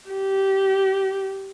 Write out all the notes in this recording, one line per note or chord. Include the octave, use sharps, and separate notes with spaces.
G4